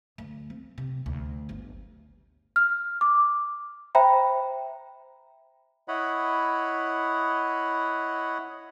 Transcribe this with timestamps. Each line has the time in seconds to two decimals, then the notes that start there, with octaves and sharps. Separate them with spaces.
0.18 D2
0.50 C4
0.78 C3
1.06 D2
1.49 G1
2.56 F6
3.01 D6
3.95 C5 E5 G5 A#5 B5
5.88 E4 C#5 D#5 F#5 B5